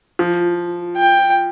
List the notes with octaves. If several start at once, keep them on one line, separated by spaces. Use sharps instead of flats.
F3
G5